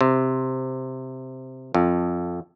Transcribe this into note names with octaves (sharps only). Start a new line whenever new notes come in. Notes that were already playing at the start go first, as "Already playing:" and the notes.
C3
F2